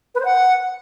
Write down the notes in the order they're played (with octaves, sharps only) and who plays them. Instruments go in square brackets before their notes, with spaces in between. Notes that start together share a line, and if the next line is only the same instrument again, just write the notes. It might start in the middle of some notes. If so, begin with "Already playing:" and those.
[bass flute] B4
C5
F#5